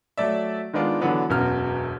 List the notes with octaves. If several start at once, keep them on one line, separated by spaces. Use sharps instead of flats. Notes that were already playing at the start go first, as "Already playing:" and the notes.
F#3 A3 D5 E5
D#3 G#3 B3 D4 F4
D3 E3 F#3 B3 D4
E1 F#2 B2 F#4 F6